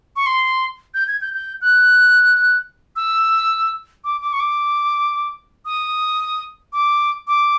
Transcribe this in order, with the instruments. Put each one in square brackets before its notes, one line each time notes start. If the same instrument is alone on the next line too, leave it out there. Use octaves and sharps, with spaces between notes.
[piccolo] C#6
C6
G6
G#6
G6
G6
F#6
E6
D6
D6
C#6
D6
D#6
D6
D6